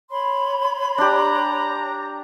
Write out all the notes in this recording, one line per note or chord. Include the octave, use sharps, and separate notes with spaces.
C#5 B5 C6
D4 G4 A#5